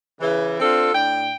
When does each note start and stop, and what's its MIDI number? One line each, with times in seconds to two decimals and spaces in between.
0.21 0.56 49
0.21 0.56 52
0.60 0.93 60
0.60 0.93 62
0.60 0.93 65
0.60 0.93 69
0.93 1.35 45
0.93 1.35 62
0.93 1.35 79